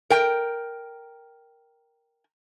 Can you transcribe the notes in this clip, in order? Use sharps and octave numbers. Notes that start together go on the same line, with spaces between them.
A#4 G5